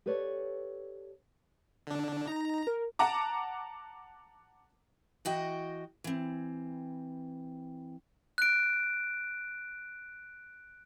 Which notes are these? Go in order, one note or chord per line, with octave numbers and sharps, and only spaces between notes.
G4 A4 B4 C#5 D5
D3 D4
D#4 A#5
A#4
F#5 A5 A#5 D6
E3 F#4 D#5 G5
E3 C4
F#6 D7